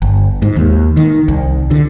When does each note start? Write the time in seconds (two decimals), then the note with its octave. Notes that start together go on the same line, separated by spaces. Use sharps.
0.02 G1
0.42 G#2
0.56 D#2
0.97 D#3
1.28 C2
1.71 D3